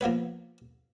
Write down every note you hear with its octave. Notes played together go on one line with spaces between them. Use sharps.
F3 A#3 B3 B4